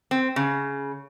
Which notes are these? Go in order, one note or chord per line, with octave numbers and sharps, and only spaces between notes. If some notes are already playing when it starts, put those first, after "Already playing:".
C4
C#3